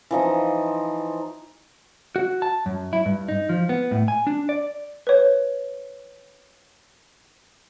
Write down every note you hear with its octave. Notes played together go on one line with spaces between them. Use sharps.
E3 F3 D#4
F#4
A5
F#2
E4
G2
D#4
F3
B3
A2
G#5
D4
D5
B4 C#5